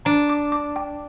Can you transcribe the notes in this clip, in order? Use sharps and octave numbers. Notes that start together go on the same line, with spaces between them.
D4 A#5
D6
D6
G5